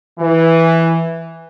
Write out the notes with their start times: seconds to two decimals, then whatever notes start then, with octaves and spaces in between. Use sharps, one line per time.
0.20 E3